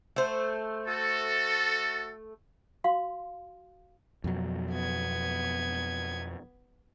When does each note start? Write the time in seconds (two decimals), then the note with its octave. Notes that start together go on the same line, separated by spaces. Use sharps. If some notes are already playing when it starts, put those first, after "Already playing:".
0.16 A3 C5
0.87 F#4 A4
2.84 F#4 F5 C6
4.24 F2 B2 F#3
4.71 B3 G#6